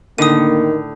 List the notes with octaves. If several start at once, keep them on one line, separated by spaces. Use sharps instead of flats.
A2 D3 D#3 A#3 D#6 D#7